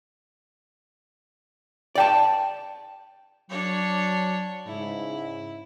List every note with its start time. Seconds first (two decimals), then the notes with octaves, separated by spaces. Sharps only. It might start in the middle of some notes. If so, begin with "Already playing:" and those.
1.95 D5 G5 A5
3.50 F#3 D4 C#5
4.67 G#2 C#3 E4